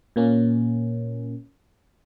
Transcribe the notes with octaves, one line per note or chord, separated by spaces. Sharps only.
A#2 A#3 C#4